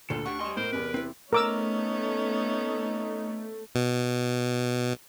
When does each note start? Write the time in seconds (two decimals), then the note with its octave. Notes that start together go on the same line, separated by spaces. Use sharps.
0.10 D2 A#2 D3 F4 A4
0.26 D4 G4 F#5 C#6
0.40 G3 D#5 C6
0.57 A2 A#4 C5
0.72 E2 C3 B4
0.94 C4 E4
1.33 A3 B3 C#4 D#4 A#4 D6 E6
3.75 B2